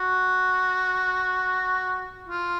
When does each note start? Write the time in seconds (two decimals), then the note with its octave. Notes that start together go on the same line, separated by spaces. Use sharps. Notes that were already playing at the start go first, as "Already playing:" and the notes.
Already playing: F#4
2.28 F4